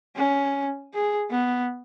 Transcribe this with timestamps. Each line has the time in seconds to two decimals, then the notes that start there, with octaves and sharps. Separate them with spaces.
0.16 C#4
0.94 G#4
1.30 B3